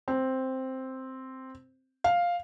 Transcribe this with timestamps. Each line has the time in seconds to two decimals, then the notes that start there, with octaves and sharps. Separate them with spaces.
0.08 C4
2.04 F5